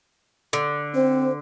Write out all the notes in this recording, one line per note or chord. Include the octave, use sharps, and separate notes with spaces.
D3
C4 C5